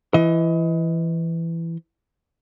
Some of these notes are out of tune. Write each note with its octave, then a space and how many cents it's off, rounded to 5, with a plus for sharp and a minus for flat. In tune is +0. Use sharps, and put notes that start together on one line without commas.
E3 +15 D#5 +30